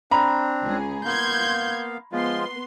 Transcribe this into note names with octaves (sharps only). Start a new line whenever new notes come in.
C4 D4 A#5 B5
C#2 G#4
A#3 B3 F5 C6 G6 G#6
F3 G#3 B3 F4 C6